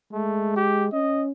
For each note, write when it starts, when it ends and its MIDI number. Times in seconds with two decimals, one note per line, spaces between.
0.13 0.90 56
0.13 0.55 57
0.56 0.87 67
0.93 1.31 61
0.93 1.24 75